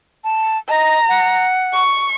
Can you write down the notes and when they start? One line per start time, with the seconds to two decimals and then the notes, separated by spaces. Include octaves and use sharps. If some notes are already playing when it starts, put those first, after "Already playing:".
0.24 A5
0.69 D#5 A#5
1.09 F#5
1.73 C#6